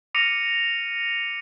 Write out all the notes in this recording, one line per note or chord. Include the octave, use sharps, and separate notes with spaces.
D6 F6 A#6 C#7 D#7 F7